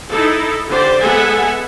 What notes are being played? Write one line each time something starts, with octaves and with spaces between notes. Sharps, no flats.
D#4 E4 A4
D3 G4 C5 D5
G#3 B3 A4 E5 F#5 G#5